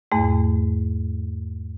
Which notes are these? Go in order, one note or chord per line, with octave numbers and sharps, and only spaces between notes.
E2 G#2 A3